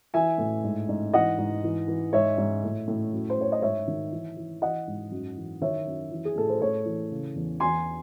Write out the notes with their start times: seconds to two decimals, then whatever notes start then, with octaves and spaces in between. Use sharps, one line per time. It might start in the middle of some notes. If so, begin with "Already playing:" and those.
0.14 E3 E5 G#5
0.38 A2
0.64 G#2
0.89 G#2
1.14 E3 D#5 F#5
1.38 G#2
1.63 E3
1.88 E3
2.13 G#2 C#5 E5
2.38 G#2
2.63 A2
2.88 A2
3.13 F#2
3.30 C5
3.37 F#2 C#5
3.52 D#5
3.62 G#2 C#5 E5
3.88 D#3
4.12 E3
4.37 E3
4.62 E3 D#5 F#5
4.87 G#2
5.11 F#2
5.36 E3
5.61 D#3 C#5 E5
5.87 F#2
6.11 E3
6.25 G#4
6.36 A2 A4
6.49 C5
6.60 A2 A4 C#5
6.86 E3
7.11 C#3
7.35 E2
7.60 E2 G#5 C6